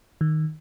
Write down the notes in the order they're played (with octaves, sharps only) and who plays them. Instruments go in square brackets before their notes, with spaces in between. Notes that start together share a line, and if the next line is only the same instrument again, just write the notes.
[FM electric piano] D#3